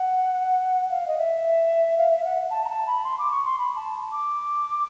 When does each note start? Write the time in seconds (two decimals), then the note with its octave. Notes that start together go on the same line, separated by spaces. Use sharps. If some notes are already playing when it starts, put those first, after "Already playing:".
Already playing: F#5
0.91 F5
1.07 D#5
1.18 E5
1.98 F5
2.11 E5
2.25 F#5
2.51 A5
2.65 A#5
2.69 A5
2.87 B5
3.04 C6
3.18 D6
3.31 C#6
3.45 C6
3.59 B5
3.76 A5
4.12 D6